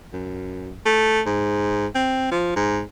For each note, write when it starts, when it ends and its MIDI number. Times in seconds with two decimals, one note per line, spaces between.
0.13 0.72 42
0.86 1.21 57
1.26 1.87 44
1.95 2.29 60
2.31 2.55 53
2.56 2.81 44